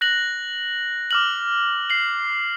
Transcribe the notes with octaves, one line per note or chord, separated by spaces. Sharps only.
F#6 A#6 F#7
D6 F6 F#7
C7 F#7